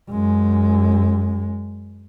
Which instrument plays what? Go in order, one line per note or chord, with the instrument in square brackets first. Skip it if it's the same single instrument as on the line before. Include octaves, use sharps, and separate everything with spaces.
[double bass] F#2 G#3